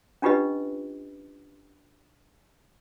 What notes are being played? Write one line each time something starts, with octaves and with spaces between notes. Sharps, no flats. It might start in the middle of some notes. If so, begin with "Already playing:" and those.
C#4 D4 F4 G4 B4 D#5